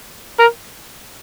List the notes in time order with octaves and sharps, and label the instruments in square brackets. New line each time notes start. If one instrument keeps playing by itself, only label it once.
[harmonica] A#4